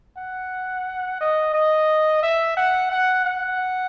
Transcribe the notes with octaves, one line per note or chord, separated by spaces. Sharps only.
F#5
D#5
D#5
E5
F#5
F#5
F#5